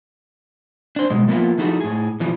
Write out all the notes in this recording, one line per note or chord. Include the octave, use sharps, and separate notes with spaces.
D4 C5
B2 G3 G#3
F3 A#3 B3 C#4 E4 F4
F3 D#4 E4 F#4 G#4 A4
A2 G#4
B2 E3 F3 G3